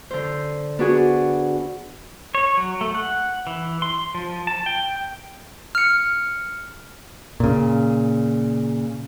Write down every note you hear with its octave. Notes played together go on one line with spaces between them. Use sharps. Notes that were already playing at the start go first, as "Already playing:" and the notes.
D3 C5
B3 D4 F#4 G#4
C#5
F#3
A3
F#5
E3
C6
F3
A5
G5
F6 C#7
A#2 C#3